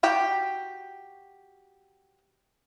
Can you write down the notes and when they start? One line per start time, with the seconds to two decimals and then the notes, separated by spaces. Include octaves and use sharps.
0.03 F#4 G4 G5